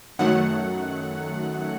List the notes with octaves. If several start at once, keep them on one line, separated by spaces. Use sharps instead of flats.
F#2 D#3 F#3 A3 F#5